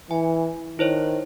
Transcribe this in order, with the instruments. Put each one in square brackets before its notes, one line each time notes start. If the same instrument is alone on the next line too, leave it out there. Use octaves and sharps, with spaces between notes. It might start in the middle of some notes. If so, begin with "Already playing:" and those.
[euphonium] E3 [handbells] G#5
[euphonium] D#3 [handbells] E4 C5 C#5